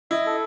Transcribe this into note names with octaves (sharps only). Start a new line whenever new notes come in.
E4 D#5
A4